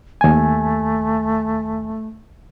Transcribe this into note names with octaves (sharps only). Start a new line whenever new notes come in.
D#2 A3 G#5